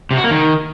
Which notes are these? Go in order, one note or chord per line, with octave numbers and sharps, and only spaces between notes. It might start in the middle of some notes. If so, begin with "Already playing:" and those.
C3
F#4
A#3
D#3